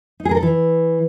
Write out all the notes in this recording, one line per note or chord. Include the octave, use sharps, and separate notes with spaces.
D#4
G#4
A#4
A4
E3